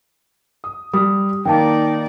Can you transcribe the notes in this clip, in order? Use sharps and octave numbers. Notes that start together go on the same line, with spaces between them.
D#6
G3 D#6
D#3 A#3 D#4 D5 G5 A5